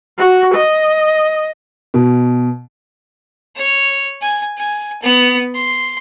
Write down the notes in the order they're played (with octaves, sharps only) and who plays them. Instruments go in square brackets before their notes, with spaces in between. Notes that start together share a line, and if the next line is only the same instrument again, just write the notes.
[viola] F#4
D#5
[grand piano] B2
[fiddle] C#5
G#5
G#5
B3
C6